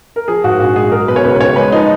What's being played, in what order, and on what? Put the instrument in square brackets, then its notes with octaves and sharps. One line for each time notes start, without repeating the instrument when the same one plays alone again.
[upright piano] A#4
F3 G#4
G#2 F#4
A#1 F#4
G#3 G#4
F#3 A#4
B2 B4
C#5
C#2 B4
B4
C#2 C#5
G#3 B4
F3 D#4